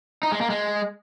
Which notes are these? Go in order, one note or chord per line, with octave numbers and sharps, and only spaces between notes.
D#4
G#3
A#3
G#3